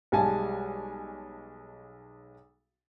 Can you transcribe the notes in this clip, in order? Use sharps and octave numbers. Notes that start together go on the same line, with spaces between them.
B1 G3 G#3 G#5 A5